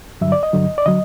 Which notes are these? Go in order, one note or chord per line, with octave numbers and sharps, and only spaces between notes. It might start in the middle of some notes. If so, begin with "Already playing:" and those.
G2 D3 F#3 E5
D5
D#5
G2 D3 F#3
D5
D3 F#3 D#5